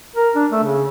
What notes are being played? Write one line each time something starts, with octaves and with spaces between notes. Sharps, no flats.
A#4
D4
A3
C#3